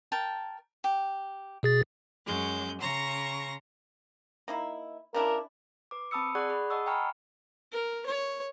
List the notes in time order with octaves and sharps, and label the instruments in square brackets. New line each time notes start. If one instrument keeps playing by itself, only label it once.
[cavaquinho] A#4 G5 A5
G4
[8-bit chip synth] B2 G#4 A6
[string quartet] F#2 F#3 G#3 C#4 G6
C#3 A#5 C6 C#6 A#6
[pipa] A#3 D#4 E4
[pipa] C#3 D4 E4 [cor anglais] A#4
[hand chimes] B4 D6
C4 A5 B5 D#6 E6 C#7
G#4 D5 F#5 C#6 D#6 F#6
G#4 B5
D#5 F#5 A5 C#6 D#6 E6
G5 G#5 A#5 B5 C#6 F6
[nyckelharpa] A#4
C#5